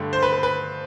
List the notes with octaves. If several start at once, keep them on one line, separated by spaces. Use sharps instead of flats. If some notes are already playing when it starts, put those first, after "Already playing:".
Already playing: G2 D3 A3
C5
B4
B4
B4